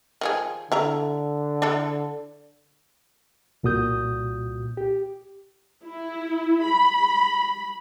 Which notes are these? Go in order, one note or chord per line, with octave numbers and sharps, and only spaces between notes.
D#3 F3 G#4
D3 E4 E5 A#5
D4 E4 A4
C2 A#2 F#4 D#6 G6
G4
E4
B5